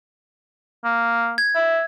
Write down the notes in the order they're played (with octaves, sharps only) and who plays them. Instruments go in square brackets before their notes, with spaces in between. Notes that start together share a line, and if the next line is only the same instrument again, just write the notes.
[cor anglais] A#3
[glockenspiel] G#6
[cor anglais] E5